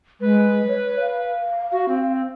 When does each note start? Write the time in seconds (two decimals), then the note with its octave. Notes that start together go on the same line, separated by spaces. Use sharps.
0.21 G#3 B4
0.68 C#5
1.00 F5
1.72 F#4
1.88 C4